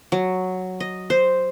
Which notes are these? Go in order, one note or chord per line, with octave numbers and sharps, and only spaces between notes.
F#3
D#5
C5